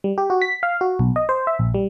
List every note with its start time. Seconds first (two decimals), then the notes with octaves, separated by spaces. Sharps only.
0.04 G3
0.18 G4
0.30 F#4
0.42 B6
0.63 F5
0.81 F#4
0.99 B1
1.16 D#5
1.29 C5
1.47 E5
1.59 A#1
1.74 G3